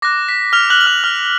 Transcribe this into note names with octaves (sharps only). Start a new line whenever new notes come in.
D6 F#6 A#6
B6
F6 F7
F#6 F#7
F#7
F6 F7
F6 F7